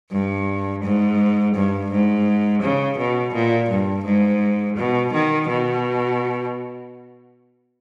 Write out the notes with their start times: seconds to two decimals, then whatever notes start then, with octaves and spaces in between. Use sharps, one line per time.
0.11 G2
0.84 G#2
1.55 G2
1.91 G#2
2.62 C#3
2.98 B2
3.33 A#2
3.70 G2
4.05 G#2
4.76 B2
5.13 D#3
5.49 B2